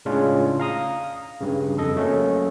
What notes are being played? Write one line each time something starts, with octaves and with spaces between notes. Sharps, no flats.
A2 C#3 G#3 C#4 D4 F4
F5 A#5 D#6
G2 C#3
F2 A4 D#5
F#3 A3 A#3 C#4